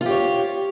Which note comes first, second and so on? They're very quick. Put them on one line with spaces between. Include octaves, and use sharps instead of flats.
F4 G4 C#5